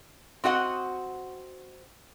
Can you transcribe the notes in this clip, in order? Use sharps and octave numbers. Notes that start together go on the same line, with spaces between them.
C4 F#4 D#5 F#5